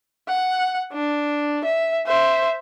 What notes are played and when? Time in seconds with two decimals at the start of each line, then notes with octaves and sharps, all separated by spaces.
0.29 F#5
0.93 D4
1.65 E5
2.07 C5 E5